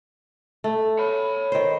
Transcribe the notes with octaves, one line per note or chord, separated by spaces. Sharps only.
A3
C#5 B5
D#3 C5